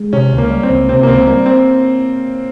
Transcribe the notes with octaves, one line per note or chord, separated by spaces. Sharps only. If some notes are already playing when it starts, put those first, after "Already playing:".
Already playing: G#3
C3 C#4
C#2
A#3
G3
C4
C#2
C3 C4
A#3
C#2 C4
G3 A#3
C4